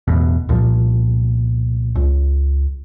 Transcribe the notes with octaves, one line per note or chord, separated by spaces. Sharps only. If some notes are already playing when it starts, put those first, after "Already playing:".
A1 E2 B2
C2 A#2 F3
C#2